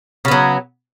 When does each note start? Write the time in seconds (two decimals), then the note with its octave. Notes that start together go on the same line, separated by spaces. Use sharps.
0.25 C#3
0.28 B3
0.31 F#3